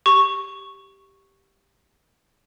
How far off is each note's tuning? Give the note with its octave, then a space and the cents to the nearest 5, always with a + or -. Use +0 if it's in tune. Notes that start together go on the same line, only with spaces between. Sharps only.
G4 +0 C#6 -5